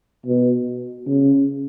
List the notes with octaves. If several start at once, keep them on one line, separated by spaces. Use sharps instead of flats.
B2
C#3